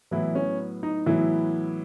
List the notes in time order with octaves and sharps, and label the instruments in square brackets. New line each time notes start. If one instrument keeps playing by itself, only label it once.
[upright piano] A2 E3 F#3 B3 E4
C#4
D#4
A2 E3 F#3 B3 E4